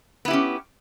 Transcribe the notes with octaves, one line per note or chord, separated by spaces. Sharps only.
B3 C#4 E4 G4